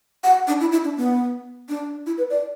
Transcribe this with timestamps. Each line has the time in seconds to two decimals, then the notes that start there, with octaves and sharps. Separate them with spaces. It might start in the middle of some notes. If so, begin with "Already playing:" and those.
0.24 F#5
0.48 D4
0.61 E4
0.72 E4
0.84 D4
0.97 B3
1.69 D4
2.06 E4
2.18 B4
2.30 D5